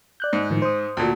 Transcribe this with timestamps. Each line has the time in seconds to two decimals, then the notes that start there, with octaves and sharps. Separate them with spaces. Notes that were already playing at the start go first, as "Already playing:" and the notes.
0.20 D5 F#6 G6
0.33 G#2
0.50 A2 D#3 F3
0.62 C5 D#6
0.97 D2 A#2